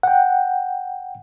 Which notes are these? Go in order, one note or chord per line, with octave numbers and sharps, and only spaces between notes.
F#5 G5